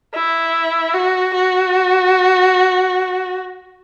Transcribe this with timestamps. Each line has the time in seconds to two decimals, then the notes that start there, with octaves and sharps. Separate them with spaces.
0.15 E4
0.94 F#4
1.34 F#4